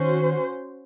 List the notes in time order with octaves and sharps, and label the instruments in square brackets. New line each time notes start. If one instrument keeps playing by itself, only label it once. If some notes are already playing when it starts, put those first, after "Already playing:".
Already playing: [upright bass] D#3 [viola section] C#4 F#4 C5